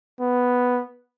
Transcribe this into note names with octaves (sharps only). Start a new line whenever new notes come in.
B3